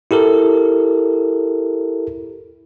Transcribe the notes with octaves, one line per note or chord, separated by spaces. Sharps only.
E4 G4 A4 A#4